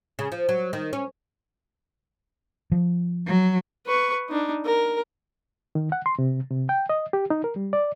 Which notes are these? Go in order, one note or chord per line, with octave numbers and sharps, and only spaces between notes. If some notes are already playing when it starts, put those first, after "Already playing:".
C#3
F3
F#3
D#3
C#4
F3
F#3
B4 C#6
D4 D#4
A#4
D#3
F#5
C6
C3
C3
G5
D#5
G4
D#4
A#4
G3
D5